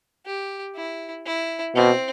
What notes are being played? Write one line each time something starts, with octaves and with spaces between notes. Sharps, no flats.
G4
E4
E4
B2 C4